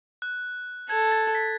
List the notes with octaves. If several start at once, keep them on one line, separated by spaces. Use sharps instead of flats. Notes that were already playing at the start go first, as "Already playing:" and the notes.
F#6
A4 G#6
A6
B6